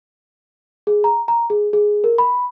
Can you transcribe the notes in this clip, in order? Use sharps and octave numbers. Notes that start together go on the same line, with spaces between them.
G#4
A#5
A#5
G#4
G#4
A#4
B5